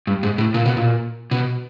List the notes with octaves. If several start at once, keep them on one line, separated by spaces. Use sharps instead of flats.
G2
G#2
A2
A#2
B2
A#2
B2